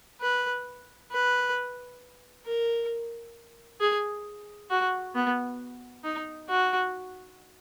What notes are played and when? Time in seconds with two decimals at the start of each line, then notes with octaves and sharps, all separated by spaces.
0.21 B4
1.11 B4
2.46 A#4
3.81 G#4
4.70 F#4
5.15 B3
6.04 D#4
6.49 F#4